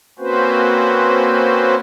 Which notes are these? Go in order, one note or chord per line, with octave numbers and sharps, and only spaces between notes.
A#3 C4 C#4 F#4 B4 C5